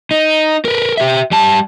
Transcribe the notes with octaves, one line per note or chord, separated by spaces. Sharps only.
D#4
A#4 B4
G4 E5
G3 A5